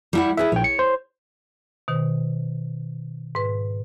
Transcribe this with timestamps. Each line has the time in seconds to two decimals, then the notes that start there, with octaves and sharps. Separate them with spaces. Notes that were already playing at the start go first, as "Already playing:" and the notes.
0.13 G3 E4 F#5
0.37 E4 G#4 B4 E5
0.52 A#1 C#5 G5
0.64 C#7
0.79 C5
1.88 B2 D#3 C5
3.35 G#2 B4